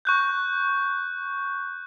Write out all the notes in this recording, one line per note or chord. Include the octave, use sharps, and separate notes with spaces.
C#6 F#6 G6